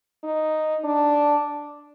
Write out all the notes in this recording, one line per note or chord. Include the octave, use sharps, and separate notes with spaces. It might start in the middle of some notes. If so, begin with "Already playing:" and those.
D#4
D4